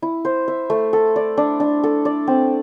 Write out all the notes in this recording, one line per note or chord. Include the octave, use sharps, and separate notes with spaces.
E4
C5
E5
A3
A4
D5
D4
D4
A4
D5
C4